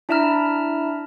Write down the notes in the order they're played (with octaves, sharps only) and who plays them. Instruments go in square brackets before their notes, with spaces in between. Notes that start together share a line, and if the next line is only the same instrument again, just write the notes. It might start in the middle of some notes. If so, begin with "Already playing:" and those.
[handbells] D4 E4 E5 A5 A#5 F6